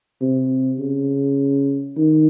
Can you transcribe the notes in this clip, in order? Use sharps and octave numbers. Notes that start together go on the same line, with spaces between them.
C3
C#3
D#3